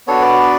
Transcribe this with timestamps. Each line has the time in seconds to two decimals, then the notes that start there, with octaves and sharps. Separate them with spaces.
0.07 B3 D4 F#4 A4 C#5
0.22 B4 D5